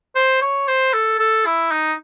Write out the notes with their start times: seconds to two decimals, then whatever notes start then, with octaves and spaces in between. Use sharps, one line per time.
0.16 C5
0.42 C#5
0.68 C5
0.93 A4
1.19 A4
1.46 E4
1.71 D#4